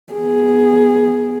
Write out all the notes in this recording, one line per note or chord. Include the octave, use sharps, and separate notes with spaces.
B3 G#4